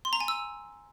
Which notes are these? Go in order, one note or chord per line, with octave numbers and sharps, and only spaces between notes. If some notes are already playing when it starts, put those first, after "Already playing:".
C6
A#5
G#5
E6